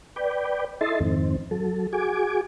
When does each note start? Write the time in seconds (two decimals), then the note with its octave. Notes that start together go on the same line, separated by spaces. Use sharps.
0.16 B4 D5 G5
0.81 E4 A4 D#5 E5 C6 A6
1.00 F2 G#2 D#3 C4
1.51 F#3 A4
1.93 F#4 G#4 G#5 D6